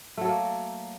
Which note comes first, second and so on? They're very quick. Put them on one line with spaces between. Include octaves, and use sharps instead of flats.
A3 F#3 A4 A#3